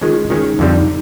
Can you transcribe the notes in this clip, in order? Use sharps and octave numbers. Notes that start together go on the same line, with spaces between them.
D#3 G#3 C#4 F4
F4
D#3 G#3 C#4 D#4
F2 D3 G3